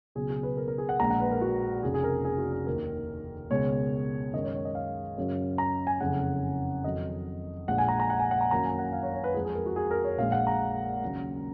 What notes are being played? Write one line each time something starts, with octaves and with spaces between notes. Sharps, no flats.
C#2 B2 F#3 G#4
G#4
B4
A#4
A#4
G#4
F#5
A#1 A#2 G#3 A#5
F#5
B4
A#4
F#4
F1 F2 C#3 F3 G#4
G#4
A#4
G#4
F#4
G#4
D#2 D#3 A#3 A#4
C#2 B2 G#3 C#5
F#2 D#3 G#3 D#5
C#5
C#5
D#5
F5
F#2 C#3 F#3
A#5
G#5
F#1 F2 C#3 F#5
F2 D#3 F#3 D#5
A#1 A#2 F3 G#3 F#5
G#5
A#5
A#5
F#5
G#5
F#5
A#5
F#2 D#3 F#3 A#3 A#5
G#5
F#5
F5
C#5
C#5
B4
F2 F3 G#3 G#4
G#4
A#4
F#4
G#4
A#4
C#5
A#1 A#2 G#3 F5
F#5
A#5
D#2 C#3 F#3 A#3